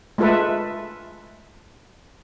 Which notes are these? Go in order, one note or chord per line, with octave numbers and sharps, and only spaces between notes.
G#3 A3 F4 A4 B4 E5